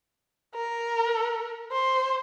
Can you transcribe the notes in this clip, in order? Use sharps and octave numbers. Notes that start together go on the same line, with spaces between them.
A#4
C5